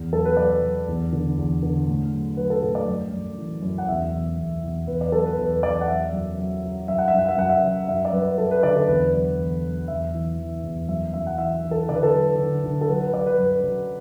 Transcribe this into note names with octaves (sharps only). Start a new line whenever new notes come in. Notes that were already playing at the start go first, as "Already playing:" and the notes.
Already playing: E2
F#3 A4
B4
F#3 D5
F#3
E2
D3
E2
D3
A2
F#3
F#3 B4
A4
A2 A4
D5
F#2
F#2
E3
F#2
F#5
E2 E5
E2
E2
E2
E2 B4
D5
B4
F#3 A4
B4
E2 B4
E2 D5
F#5
F#3 E5
F#2
F#3
F#3
F#2 E5
F#5
E5
F#2 F#5
E5
F#2 F#5
E5
F#3
F#2 E5
D5
F#2 B4
F#2 A4
B4
D3 D5
A4
E2 B4
F#3
E2
F#3
E2 E5
E3
E3
E2
F#2 E5
F#2 E5
F#5
E3 E5
E3
A4
D3 D5
B4
A4
B4
F#3
D3
D3
A4
F#3 B4
B4
F#3 D5
B4
F#2
F#3